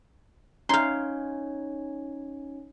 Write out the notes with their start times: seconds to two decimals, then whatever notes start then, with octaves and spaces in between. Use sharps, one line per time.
0.69 C#4 D#4 C#5 F5 A#5 C6 G6